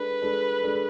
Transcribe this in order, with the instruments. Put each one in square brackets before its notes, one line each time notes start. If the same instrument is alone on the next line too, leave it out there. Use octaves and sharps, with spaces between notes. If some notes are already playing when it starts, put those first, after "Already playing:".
Already playing: [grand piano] G#3 D4 A4 [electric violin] B4
[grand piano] G#3 D4 A4
G#3 D4 A4